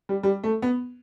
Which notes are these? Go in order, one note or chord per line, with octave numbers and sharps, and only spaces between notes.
G3
G3
A3
B3